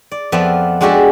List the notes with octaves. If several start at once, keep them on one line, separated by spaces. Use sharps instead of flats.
D5
F2 F3 B3 D5 E5
G#3 D4 F#4 G4 A4